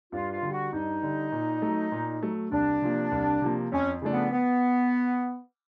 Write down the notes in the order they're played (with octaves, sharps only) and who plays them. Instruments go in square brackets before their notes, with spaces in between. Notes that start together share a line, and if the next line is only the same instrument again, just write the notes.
[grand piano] G2 [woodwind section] F4
[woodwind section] F4
[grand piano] D3 G3
[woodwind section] F#4
[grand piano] G2 [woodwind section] D#4
[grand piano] D3 G3
A#2
F#3 A3
A#2
F#3 A3
[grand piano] C2 [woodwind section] D4
[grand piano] C3 F3 A#3
C2
C3 F3 A#3
[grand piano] F2 [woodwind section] C#4
[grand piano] C#3 F3 A3 D4
[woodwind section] B3
B3